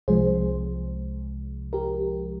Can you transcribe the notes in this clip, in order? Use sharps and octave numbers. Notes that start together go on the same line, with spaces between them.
C2 C3 F3 G#3 G#4 C5
G4 A#4